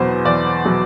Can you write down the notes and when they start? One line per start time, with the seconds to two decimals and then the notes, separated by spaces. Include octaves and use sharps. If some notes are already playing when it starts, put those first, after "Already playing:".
Already playing: E2 B2 F#3 C5
0.25 E2 D5
0.65 B2 F#3